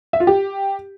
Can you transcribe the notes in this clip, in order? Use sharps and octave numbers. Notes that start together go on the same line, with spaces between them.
E5
F4
G4